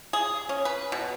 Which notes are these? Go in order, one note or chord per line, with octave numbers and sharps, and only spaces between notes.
G#4
C#4
B4
B2